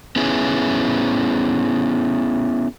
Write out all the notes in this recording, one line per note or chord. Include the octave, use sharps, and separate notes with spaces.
B3 C#4 E4 G#4